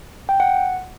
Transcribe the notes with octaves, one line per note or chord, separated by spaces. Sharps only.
G5
F#5